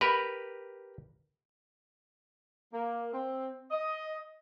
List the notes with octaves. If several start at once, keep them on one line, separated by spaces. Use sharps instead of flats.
G4 A#4 B4 B5
A#3
C4
D#5